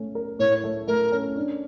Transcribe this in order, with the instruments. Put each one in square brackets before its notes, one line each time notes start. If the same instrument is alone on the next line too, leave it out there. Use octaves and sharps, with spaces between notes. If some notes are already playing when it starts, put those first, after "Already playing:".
Already playing: [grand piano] A3 C#4
A#4
[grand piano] A2 [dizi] C#5
[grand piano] A3
[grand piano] A3 [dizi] A#4
[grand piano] C#4
D4